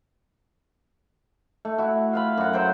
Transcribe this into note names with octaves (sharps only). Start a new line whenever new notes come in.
A3
E4 F#4
F4 F5 B5
F#2 F#5
F#3 C5 F#5 G5